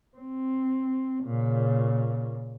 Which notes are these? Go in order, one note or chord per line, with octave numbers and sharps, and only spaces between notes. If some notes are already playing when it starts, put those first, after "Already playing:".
C4
A#2 C#3